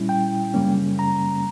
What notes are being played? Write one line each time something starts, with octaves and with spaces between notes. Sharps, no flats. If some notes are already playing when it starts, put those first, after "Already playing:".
Already playing: A#2 G3 C#4 E4
G5
F#2 C#3 G3 A#3 C#4
A#5